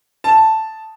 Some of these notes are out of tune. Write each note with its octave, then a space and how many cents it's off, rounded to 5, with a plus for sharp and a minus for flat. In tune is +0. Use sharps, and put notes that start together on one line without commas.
A5 +0